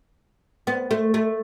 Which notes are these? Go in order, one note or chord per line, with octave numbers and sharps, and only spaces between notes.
B3
A3
A3